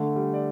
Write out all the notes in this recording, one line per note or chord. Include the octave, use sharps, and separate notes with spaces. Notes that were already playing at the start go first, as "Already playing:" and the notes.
Already playing: D3 A3
G3
D5